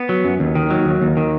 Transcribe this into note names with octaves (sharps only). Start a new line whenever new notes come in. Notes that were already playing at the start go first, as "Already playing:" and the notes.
Already playing: B3
F#3
F#2
D#2
D#3
F#3
D#2
D#2
D#3